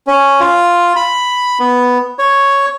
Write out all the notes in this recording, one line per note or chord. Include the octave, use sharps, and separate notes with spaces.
C#4
F4
B5
B3
C#5